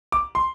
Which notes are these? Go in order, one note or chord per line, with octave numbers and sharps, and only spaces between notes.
D6
C6